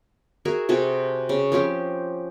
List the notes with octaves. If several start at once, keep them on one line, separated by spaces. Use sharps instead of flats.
F#4 G#4 A#4 E5
C3 F#4 G#4 A4
C#3
F3 C4 C#4 G4